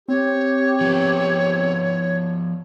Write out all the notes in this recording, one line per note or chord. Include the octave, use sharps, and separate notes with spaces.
C4 G4 C#5
F3 B3